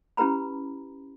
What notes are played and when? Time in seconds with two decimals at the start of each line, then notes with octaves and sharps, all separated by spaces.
0.17 C#4 E4 G4 B4 A#5 B5